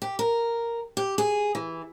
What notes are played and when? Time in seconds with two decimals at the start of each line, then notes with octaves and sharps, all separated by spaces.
0.02 G4
0.19 A#4
0.97 G4
1.18 G#4
1.55 E3